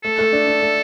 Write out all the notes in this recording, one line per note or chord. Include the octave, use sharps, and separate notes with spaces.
A3 A4
A3
D4
D4
A3